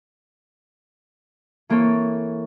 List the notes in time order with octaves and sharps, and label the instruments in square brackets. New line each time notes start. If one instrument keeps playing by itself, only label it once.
[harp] E3 A#3 C4 A4 C#5